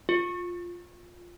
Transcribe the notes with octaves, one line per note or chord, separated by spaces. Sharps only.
F4